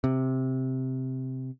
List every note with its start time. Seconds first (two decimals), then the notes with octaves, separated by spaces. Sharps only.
0.04 C3